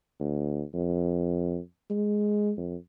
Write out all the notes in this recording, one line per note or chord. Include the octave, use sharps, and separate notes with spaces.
D2
F2
G#3
F2